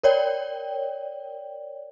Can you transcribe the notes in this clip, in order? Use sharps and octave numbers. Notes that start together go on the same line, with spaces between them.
A#4 C#5 D5 G5